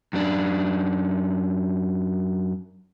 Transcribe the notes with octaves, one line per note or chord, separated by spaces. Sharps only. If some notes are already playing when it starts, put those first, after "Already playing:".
F#2 D4